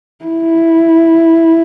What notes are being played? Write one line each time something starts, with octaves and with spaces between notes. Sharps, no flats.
E4